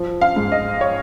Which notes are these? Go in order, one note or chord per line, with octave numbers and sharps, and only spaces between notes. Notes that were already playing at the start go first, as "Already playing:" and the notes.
Already playing: F3
F5
G#2
D#5
C#5